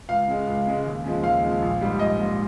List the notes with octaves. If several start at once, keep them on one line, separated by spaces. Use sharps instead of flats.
C#2 F5
C#3 G#3
C#2
C#3 G#3
D#2
C#3 F3 G#3
D#2 F5
C#3 F3 G#3
A#1
G#2 G3
A#1 D#5
G#2 G3